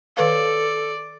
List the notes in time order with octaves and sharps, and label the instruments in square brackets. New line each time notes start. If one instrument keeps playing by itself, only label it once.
[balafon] D#3 B4 F5 [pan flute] A4 [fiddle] D5